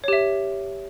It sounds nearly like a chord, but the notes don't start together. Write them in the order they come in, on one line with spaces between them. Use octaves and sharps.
C#5 G4 E5